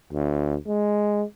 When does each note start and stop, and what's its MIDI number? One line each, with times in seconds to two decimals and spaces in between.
0.13 0.55 38
0.67 1.23 56